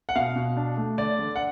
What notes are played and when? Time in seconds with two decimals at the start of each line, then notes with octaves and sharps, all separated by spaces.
0.09 F#5
0.15 B2 F5
0.36 B2
0.57 D4
0.77 A3
0.98 D3 D5
1.19 D3
1.36 F#5